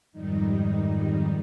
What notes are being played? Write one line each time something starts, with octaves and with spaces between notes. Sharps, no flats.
F2 G#2 D#3 G3 D#4